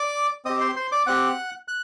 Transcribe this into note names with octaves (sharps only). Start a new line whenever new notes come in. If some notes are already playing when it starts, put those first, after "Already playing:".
Already playing: D5 D6
C4 G4 D#5 D#6
C5 C6
C5 C6
D5 D6
C4 G4 F#5 F#6
F#6